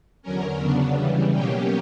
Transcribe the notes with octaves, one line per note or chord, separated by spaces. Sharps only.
E2 D3 F#3 C#4 A#4
C#3 F#3 B3 D4
C#3 E3 G3
B2 F#3 A#3 C#4 G4